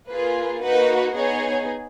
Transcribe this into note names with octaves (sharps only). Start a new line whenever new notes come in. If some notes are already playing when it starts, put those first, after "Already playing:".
A#3 F4 G#4 B4
A#3 D#4 F#4 B4
B3 D#4 G#4 C#5